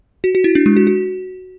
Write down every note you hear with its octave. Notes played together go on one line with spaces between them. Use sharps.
F#4
F#4
E4
D4
G#3
F#4
F#4